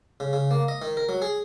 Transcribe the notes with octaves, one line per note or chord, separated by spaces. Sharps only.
C#3
C#3
A#3
D#5
D#3
A#4
F#3
G#4